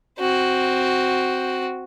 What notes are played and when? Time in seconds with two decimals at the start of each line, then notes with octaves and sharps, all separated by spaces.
0.20 C4 F#4